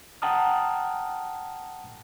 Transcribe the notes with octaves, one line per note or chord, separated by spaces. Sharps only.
F#5 G5 A5 A#5 D#6 F6